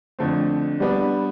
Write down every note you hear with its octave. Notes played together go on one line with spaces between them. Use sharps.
F2 D3 A3 C4
G3 B3 D4